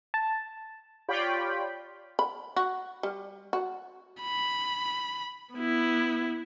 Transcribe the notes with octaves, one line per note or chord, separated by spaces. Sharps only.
A5
F4 G4 C#5 D5 G5 B5
B5
F#4
G3
F#4
B5
B3 E4